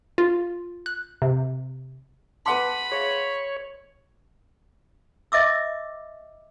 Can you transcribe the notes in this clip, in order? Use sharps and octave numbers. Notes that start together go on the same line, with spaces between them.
F4
F#6
C3
B4 F#5 A5 B5 C6 D6
G#4 C#5 E5 F5
D#5 E5 D6 E6